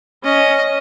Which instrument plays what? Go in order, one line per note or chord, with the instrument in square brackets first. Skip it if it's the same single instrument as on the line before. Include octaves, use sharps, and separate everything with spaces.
[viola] C#4 [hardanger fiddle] D#5